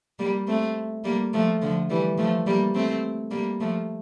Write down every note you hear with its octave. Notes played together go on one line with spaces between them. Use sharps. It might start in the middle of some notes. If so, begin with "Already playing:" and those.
G3 A#3
A3 C4
G3 A#3
F3 A3
D3 F3
E3 G3
F3 A3
G3 A#3
A3 C4
G3 A#3
F3 A3